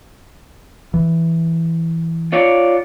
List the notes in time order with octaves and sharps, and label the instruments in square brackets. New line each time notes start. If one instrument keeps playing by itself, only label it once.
[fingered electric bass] E3
[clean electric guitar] F4 C#5 D5